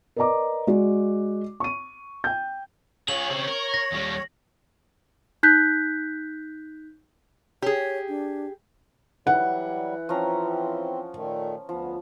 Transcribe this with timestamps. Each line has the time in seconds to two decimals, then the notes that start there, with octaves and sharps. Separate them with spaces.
0.16 A#4 B4 D5 D#5 A#5 D6
0.67 G#3 F#4 D5
1.60 C#6 D#7
2.24 G5 G6
3.08 F4 G#4 C#5 F#7
3.30 C#3 C4
3.48 A#4
3.74 A#6
3.92 D#2 G3
5.43 D#4 F#6 G6 B6
7.62 G4 G#4 C#5
8.08 D4
9.27 E3 F#3 G3 F#5
10.09 F3 C4 C#4 A#5
11.15 A#2 D#3 A3
11.69 D2 F3 B3